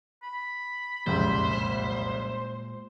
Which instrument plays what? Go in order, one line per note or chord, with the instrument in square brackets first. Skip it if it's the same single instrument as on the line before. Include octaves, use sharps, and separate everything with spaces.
[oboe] B5
[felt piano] F#1 C2 F2 [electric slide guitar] A#2 G#3 E5 [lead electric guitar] C5